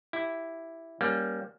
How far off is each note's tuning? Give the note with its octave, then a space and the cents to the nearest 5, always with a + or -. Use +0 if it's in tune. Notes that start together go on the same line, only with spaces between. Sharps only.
E4 +0 G4 +0
G3 +0 A#3 +20 C#4 +0